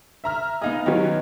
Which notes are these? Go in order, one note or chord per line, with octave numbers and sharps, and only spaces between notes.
E5 A#5 F6
B3 D#4 G#4 D#5 F5
D#3 F#3 B3 C#4 G4